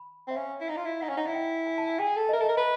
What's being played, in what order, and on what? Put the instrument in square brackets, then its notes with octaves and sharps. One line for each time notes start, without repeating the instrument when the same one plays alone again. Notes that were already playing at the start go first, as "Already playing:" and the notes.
Already playing: [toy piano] B5
[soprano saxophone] C4
[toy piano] E5
[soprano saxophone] C#4 [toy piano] F5
[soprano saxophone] E4
[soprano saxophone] D#4 [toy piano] F5
[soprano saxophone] F4
E4
[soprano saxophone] D#4 [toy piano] F#5
[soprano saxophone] C#4 [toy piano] F5
[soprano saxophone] D#4 [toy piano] F#5
[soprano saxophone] E4 [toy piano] G#5
[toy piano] G5
G#5
A5
G#5
[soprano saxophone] G#4 [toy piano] G5
[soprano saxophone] A4
[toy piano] D#5
[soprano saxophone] A#4 [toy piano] E5
[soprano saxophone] A4 [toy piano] D#5
[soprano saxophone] A#4
[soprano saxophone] B4 [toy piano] D#5